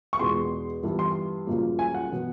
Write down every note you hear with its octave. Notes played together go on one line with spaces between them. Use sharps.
C#6
E2 B2 G#3 B3 C6
G2 E3 G3 B3
C6
G1 F#2 C#3 F3 A#3
G#5
F#5
B2 F#3 B3